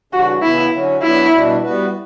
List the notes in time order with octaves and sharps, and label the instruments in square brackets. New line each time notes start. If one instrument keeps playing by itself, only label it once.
[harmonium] C#3 E3 G3 D4 [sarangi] F#4
[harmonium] C#3 E3 B3 [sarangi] E4
[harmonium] D3 F#3 C#4 F#4
[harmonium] F#3 B3 D4 F#4 [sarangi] E4
[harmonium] B2 G3 D4 F#4
G3 B3 F#4 B4